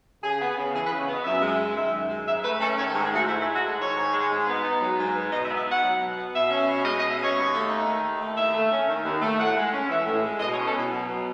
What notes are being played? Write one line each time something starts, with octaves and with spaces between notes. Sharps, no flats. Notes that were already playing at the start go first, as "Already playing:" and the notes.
C#3 G#4
B3
C#3
E3 G#4
B4
C#3
C#5
B3 D#5
F#2 E5
G#3
F#2
D#3 E5
F#2
G#3
G#2 E5
A3 B4
C#4 A4
D#3 C#5
A4
G#2
G#4
A3 F#4
G#2 E4
E4
G#3
F#4
G#2 A4
D#3 C#5
G#2
G#3
G#2
B3
D#4
F#3
G#2
B3
B2 D#5
E5
B3
E5
D#4 F#5
F#3
B2
B3
B2 E5
C#4
B2
G#3 D#5
D#5
B2
E5
C#4 C#5
D#2
A3
D#4
D#3
D#2
A3
D#2 E5
A3
C#4
D#3
D#2
A3
A2 F#5
G#3
C#4
E3 E5
A2
G#3
B2 D#5
C#5
C#4
A4
B2 E4
F#3
B2